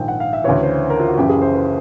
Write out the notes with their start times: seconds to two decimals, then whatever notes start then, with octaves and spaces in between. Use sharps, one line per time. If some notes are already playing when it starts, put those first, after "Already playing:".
Already playing: A#1 G#2 D#3 G5
0.08 F#5
0.20 F5
0.33 E5
0.44 D2 C#3 E3 C#5
0.63 C5
0.90 A#4
1.00 F4
1.08 F#4
1.17 F#1 F#2 C#3 E3 G4
1.29 G#4
1.42 C5
1.54 B4